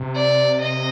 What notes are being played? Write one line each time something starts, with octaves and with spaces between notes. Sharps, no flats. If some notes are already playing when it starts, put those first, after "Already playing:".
Already playing: C3
D5
D#5